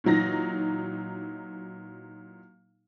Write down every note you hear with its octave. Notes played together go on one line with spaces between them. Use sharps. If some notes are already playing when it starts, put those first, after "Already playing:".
A#2 E3 F#3 D#4 A#6